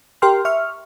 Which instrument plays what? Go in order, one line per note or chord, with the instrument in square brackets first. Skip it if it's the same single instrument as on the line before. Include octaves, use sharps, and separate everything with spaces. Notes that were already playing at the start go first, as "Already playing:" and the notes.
[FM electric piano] G4 A#4 G5 C6 F6
E5 C#6 F6